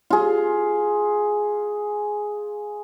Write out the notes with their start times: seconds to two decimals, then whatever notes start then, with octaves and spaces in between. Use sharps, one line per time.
0.10 F4 G#4